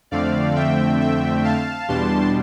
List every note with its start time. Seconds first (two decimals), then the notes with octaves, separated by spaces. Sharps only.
0.11 F2 D3 A3 C4 D5 F5
0.56 E5 G5
1.00 E5 G5
1.44 F5 A5
1.88 E2 B2 G3 D4 A5 C6